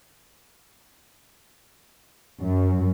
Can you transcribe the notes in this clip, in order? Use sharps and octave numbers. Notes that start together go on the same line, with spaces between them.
F#2